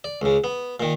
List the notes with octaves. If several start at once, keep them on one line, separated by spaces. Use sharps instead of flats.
D5
C#2 C#3
B3
A#2 D#3